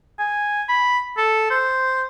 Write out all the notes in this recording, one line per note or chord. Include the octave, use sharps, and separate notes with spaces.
G#5
B5
A4
C5